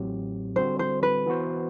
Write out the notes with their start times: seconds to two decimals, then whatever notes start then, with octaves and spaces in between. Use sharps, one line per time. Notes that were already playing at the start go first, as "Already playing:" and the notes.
Already playing: A1 A2 F#3 C4 G4
0.56 D3 G3 C4 F#4 A4 C5
0.79 C5
1.03 B4
1.26 E3 B3 F#4 C5